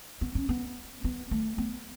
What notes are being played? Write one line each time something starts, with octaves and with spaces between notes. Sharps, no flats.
B3
C#4
B3
B3
A3
B3